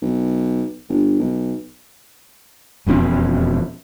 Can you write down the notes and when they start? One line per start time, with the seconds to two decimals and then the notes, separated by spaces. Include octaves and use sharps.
0.02 B1
0.89 G1
1.19 B1
2.86 E1 F2 B2 C#4